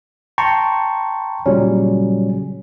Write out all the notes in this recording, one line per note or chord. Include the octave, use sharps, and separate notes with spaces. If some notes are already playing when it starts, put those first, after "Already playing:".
G5 A5 A#5 C6 C#6
A#2 C#3 F#3 G3 C#4